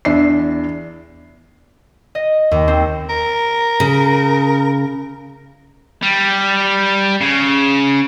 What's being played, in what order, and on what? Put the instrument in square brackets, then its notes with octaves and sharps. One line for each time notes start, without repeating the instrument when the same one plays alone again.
[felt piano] E2 D4 E5 C7
[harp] D#5
D#2
C4
[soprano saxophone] A#4
[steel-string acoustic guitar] C#3
[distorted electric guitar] G3
C#3